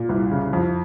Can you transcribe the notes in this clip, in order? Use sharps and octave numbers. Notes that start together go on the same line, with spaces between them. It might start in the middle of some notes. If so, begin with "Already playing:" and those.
Already playing: A#2
C2
C#3
F2